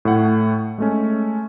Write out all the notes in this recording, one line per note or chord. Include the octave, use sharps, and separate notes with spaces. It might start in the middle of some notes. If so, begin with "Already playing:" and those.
A2 A3 F#5
G#3 A3 C#4